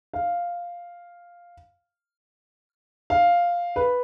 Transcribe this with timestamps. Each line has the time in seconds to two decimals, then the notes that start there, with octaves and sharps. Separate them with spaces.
0.14 F5
3.10 F5
3.76 B4